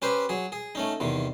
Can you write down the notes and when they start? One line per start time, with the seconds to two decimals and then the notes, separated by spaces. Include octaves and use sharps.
0.02 C#4 G4 B4 C5
0.29 F#3 G#4
0.52 G#4
0.75 A3 C#4 D#4
1.00 E2 C3 D#3